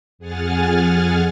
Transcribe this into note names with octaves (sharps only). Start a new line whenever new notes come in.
F2 G#4 F#5 G#5 F6 A6